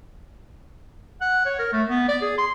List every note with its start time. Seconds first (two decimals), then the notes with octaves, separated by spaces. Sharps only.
1.21 F#5
1.45 C#5
1.59 A#4
1.73 A3
1.88 B3
2.08 D5
2.22 G#4
2.38 C6